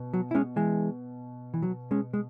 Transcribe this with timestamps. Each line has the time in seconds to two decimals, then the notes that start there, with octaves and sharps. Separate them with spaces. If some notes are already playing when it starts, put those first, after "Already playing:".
Already playing: B2
0.13 F#3
0.31 E4
0.35 G#3 C#4
0.56 E3 G#3
1.54 E3
1.63 F#3
1.91 G#3 C#4
2.13 G#3